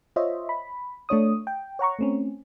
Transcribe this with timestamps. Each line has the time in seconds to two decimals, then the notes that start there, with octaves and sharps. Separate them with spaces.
0.16 F4 C5 C#5 D#5 E5
0.49 B5
1.09 A3 D4 C#5 D#6
1.47 G5
1.79 C#5 F#5 A#5 C#6
1.99 A3 C4 C#4